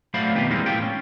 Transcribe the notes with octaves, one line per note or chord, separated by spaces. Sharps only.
F#3 A3 C5 D5 F5 B5
F2 B2 D#3 B3 G4 B4
E3 G3 G#3 A#3 C4 D#4
A2 E4 F4 G4 G5
C#4